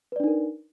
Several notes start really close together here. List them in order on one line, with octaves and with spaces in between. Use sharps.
B4 D5 D4 D#4 A#4